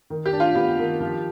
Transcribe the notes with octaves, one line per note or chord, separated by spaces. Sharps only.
D#3
G4
D4
F4
B3 G4
D#3
F3